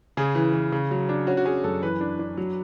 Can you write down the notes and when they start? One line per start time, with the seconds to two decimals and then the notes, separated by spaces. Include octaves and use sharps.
0.17 C#3 G#4
0.35 E3
0.53 E3
0.72 C#3
0.91 F#3
1.09 D4
1.27 C#4 F#4
1.37 F#4
1.45 C#4 G#4
1.64 F#2 A4
1.82 E3 B4
2.01 D4
2.19 D4
2.37 F#3